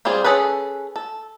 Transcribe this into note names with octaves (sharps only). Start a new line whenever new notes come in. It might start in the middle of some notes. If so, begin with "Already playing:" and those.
G3 C4 F4 G#4
C#4 G#4 A4 B4
A4